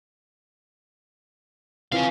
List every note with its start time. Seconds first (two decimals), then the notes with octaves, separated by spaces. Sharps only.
1.92 E3 F3 C4 C#5 F5